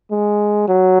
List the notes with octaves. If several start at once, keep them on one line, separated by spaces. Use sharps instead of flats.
G#3
F#3